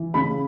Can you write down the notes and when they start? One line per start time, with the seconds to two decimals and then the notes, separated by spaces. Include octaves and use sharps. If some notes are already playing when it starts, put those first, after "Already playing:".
Already playing: E3
0.14 C#3 B5